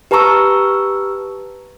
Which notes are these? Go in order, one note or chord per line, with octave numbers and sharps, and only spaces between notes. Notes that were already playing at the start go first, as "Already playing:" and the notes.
G4 B4 A5 A#5 C#6 E6